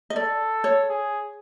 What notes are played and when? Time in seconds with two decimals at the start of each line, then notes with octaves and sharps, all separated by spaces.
0.10 D#5
0.16 A4 D5
0.64 C#5
0.89 G#4